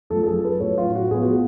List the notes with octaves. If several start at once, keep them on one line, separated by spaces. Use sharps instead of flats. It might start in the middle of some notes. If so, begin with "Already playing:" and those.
F#2 F3 A3 A4
A4
G#4
B4
A2 F#3 A3 C#4 C#5
F4
F#4
A2 F3 B3 G#4
F#4